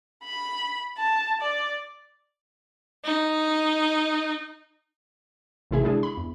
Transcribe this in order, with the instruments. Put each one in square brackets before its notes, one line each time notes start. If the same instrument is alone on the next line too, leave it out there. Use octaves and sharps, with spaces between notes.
[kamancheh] B5
A5
D5
[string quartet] D#4
[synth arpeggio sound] A1 C3 E4 G#4 E5
D3 G#3 D4 E4 G#4
B5
E2